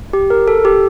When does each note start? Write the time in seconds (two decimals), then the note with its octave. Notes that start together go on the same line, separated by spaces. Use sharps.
0.13 G4
0.30 A#4
0.48 A4
0.65 G4